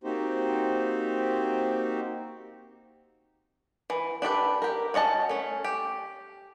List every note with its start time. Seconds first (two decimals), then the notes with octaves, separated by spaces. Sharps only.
0.04 A#3 C4 D#4 F#4 G4 C5
3.90 E3
4.22 D4 G4 A4 B4
4.62 G4 A#4
4.94 C#4 F#4 D#5 A5
5.29 A3 C#4
5.64 G4